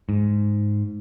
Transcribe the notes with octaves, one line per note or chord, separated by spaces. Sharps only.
G#2